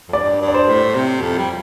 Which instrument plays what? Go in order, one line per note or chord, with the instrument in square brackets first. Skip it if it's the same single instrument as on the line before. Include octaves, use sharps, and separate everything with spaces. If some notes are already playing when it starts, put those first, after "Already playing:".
[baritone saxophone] F2
[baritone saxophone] G2 [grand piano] D5
[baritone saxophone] G2
[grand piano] D5
C5
[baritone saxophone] A2
C3
F2
G3